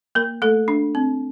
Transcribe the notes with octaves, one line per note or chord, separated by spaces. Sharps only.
A#3 A#4
A3 A4
D4
C4